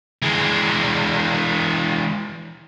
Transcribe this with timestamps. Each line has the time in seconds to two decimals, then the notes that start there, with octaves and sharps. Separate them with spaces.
0.22 E3 G#3